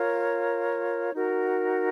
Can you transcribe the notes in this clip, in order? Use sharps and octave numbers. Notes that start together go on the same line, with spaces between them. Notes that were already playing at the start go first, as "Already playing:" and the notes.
Already playing: F4 A#4 C#5
D#4 F#4 A#4